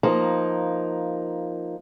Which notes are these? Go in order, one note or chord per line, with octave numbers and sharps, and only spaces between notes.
F3 A#3 D#4